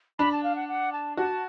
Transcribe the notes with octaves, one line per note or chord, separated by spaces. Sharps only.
D4 B5
A5
F5
F#5
F#5
A5
F#4 A5